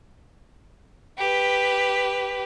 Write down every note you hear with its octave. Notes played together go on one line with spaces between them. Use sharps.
G4 B4